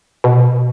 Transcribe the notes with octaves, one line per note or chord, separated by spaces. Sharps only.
B2